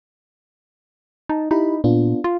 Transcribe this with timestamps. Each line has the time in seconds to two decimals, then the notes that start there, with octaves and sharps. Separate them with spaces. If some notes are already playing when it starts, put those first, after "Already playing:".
1.29 D#4 A5
1.51 D#4 E4 G4 B5
1.84 A#2 B3 D4 F4
2.24 F4